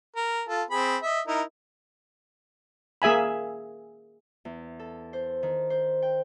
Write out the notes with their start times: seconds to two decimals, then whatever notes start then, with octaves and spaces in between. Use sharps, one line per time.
0.16 A#4
0.49 F4 A4
0.71 C4 G#4 B5
1.02 D#5 E5
1.28 D#4 E4 A#4
3.02 A#3 G#4 E5 G#5 B5
4.45 E2
4.79 A4
5.13 C5
5.43 D#3
5.70 C5
6.02 G5